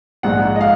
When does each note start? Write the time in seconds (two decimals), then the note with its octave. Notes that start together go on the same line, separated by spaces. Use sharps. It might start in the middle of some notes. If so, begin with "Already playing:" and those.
0.23 A#1 G#2 F3 G#3 F#5
0.56 D#5
0.61 F5